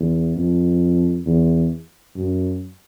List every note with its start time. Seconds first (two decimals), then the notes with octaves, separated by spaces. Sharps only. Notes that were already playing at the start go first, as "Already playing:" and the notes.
Already playing: E2
0.36 F2
1.26 E2
2.16 F#2